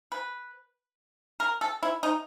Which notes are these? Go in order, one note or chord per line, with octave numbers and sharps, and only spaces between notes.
B4
A#4
A4
E4
D#4